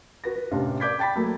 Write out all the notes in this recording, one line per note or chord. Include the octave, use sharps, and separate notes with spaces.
F#4 B4 A#6
B4
A1 C3 D4 F5
D5 D6 G6 G#6 B6
G5 A5 B5 A6 B6
F#3 A3 A#3